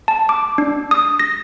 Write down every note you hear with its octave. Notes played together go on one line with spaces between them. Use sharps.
A5
D6
D4
D#6
A#6